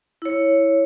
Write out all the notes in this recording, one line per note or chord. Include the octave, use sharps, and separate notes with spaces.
E4 C#5